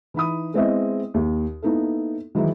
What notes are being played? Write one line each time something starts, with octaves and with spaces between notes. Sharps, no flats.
E3 D#4 B5 D#6
G#3 B3 C4 E4 G#4 D#5
D#2
A#3 B3 D#4 E4 A4
D#3 E3 F#3 G#3 D#4 E4